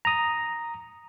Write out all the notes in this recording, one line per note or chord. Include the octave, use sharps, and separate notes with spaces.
A#5 D#6